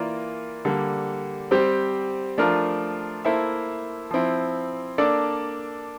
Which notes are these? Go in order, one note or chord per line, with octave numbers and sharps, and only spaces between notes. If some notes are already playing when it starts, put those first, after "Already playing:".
Already playing: E3 A#3 F4 A#4 D5
D3 G3 A#3
G3 C4 G4 C5
F3 A3 D4 F4 A#4
A#3 E4 A4 C5 E5
F3 C4 E4
A#3 D4 A4 D5